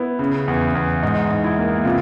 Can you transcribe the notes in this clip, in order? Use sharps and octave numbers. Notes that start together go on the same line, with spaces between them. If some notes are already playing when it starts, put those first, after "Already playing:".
Already playing: B3 E4
C#3
E2
E2
G#2 D#4
G#2
E4
A#3
C3 F4